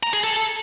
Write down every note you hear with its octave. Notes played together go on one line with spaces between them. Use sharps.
A#5
G#4
A4